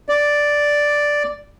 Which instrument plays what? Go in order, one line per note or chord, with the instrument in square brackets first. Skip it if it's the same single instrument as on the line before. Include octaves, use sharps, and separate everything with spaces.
[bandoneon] D5